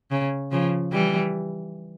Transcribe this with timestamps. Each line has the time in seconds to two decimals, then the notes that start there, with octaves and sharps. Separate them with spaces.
0.11 C#3
0.52 C#3 F3
0.92 E3 G3